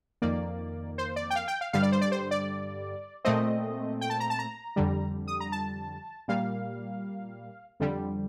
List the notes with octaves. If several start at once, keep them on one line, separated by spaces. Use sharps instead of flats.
F2 D#3 A#3 D5
C5
D5
G5
F5
G5
F5
G2 D3 G3 F5
D5
C5
D5
C5
D5
A#2 A3 C4 D#5
G5
A5
A#5
A5
A#5
F2 D3 G3
D#6
A#5
A5
A#2 G3 A#3 F5
F2 D3 G3